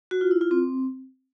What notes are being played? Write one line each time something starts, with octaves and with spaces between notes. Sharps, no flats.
F#4
F4
E4
F4
C4